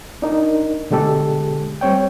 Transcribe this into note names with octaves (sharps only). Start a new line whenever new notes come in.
D4 D#4 A#4
B2 D3 G#3 G4 A4
G3 C4 C#5 G5